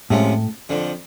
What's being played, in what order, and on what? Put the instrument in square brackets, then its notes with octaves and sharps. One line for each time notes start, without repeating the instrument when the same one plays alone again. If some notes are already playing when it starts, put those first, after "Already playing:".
[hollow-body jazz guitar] A2 [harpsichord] C3 F3 G#3 C#4
[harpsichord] F2 D3 F3